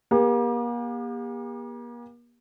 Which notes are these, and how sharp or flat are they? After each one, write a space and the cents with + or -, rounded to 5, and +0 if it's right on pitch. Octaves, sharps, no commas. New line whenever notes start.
A#3 +40 G4 +40